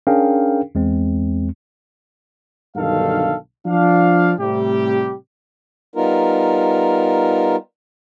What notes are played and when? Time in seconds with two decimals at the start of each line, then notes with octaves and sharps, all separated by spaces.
0.07 C#4 D4 G#4 A#4 F5 G5
0.75 E2 G#3 C4
2.76 B1 G2 D3 D#3 A4 F5
3.66 F3 D4 F5
4.39 A2 C3 G3 G4
5.94 G3 B3 D#4 F4 A#4